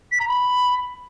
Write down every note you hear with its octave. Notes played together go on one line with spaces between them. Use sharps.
B6
A#5
B5